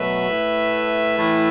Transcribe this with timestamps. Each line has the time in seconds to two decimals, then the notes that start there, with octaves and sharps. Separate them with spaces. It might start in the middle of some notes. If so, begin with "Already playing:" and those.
Already playing: B2 F#3 A3 B4 E5
0.28 A2 A3
1.17 A2 E3 A3